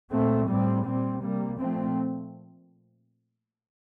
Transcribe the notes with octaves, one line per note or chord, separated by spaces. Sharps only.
A#2 A3 C4
A2 G3 C4
A#2 G3 C4
C3 G3 A#3
A#2 F3 A3 C4